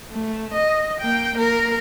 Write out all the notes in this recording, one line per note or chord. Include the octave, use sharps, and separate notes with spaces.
A3
D#5
A#3 G5
A#3 A#4